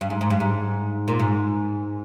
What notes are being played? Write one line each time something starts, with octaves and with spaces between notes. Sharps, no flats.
G2
G#2
G#2
G2
G#2
A#2
G#2